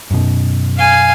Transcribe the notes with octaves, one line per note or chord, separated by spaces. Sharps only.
F#2 B2
F5 G#5